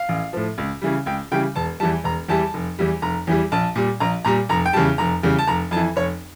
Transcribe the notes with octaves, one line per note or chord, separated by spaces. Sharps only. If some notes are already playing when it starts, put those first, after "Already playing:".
Already playing: F5
A1
A2 F3
C#2
C#3 E3 G3
C#2 G5
C#3 E3 G3 G5
E1 A5
E2 E3 G3 A5
E1 A#5
E2 E3 G3 A5
F1
E2 E3 G3
F1 A#5
E2 E3 G3
A#1 A5
A#2 G3
A#1 A#5
A#2 G3 A#5
F1 A#5
G5
E2 C#3 G3 A5
F1 A#5
E2 C#3 G3
A5
F1 A#5
F2 A5
E3
F1 C#5